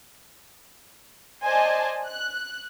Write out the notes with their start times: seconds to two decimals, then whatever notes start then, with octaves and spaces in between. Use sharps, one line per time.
1.45 C5 D5 D#5 G#5 A5
2.09 F#6